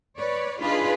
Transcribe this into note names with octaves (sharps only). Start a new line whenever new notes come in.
B4 C#5 D5
D4 D#4 F4 G#4 B4